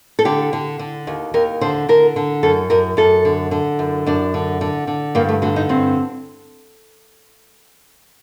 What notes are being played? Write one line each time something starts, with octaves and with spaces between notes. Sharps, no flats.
A4
D3 G4
D3
D3
D#2
D#2 A#4
D3 C5
D3 A#4
D3
F#2 A4
F#2 A#4
F#2 A4
D3
D3
F#2
F#2 D4
D3
D3
D3
G2 A#3
A3
D3 F#4
D#4
G2 C4